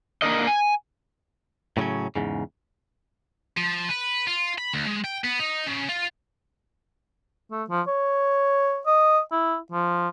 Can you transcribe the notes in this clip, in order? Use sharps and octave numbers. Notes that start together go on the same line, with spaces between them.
A#3 D4 A#4 D#5
G#5
A2 C#3 F3 F#3 C#4
E2 G#2 C#3
F3
B4
F4
B5
D2
G#3
G5
B3
D#4
C#3
F4
A3
F3
C#5
D#5
E4
F3